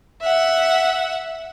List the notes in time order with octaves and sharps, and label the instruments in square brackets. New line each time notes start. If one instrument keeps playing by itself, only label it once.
[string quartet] E5 F#5